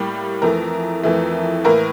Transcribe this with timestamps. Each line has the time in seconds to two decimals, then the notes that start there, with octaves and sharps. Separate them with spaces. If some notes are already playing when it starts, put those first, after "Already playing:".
Already playing: A2 G3 A#3 G4
0.42 F2 E3 A3 A#4
1.03 F2 E3 A3
1.64 A2 E3 A#3 A#4